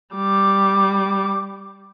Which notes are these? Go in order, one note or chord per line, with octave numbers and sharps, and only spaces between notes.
G3 D6